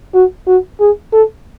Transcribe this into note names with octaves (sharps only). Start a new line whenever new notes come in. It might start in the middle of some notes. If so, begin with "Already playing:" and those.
F#4
F#4
G#4
A4